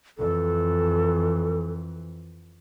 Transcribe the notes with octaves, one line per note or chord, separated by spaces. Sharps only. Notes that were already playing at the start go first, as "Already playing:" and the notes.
F2 E3 A4